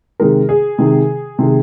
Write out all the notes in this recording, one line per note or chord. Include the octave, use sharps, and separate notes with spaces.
C3 D#3 G#3 A#4
G#4
C3 D#3 G#3
C3 D#3 G#3